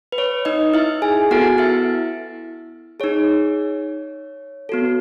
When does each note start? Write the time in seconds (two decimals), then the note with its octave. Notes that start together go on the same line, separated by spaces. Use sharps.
0.12 B4
0.18 C#5
0.45 D#4 D#5
0.74 E4 E5
1.02 G#4 G#5
1.31 B3 E4 F#4 A4 F#5
1.58 E4 E5
3.00 D#4 G#4 C#5
4.69 B3 F#4 A4